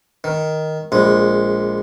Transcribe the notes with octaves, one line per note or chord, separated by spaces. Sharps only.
D#3
A#1 G#3